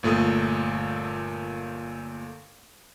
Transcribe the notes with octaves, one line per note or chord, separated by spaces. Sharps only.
G1 A#2 A3 A4 D#6